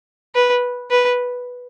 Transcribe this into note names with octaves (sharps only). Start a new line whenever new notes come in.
B4
B4